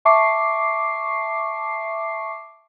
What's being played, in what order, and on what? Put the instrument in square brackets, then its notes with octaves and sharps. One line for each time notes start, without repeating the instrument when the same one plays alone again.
[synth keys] E5 A5 C#6 D6 C7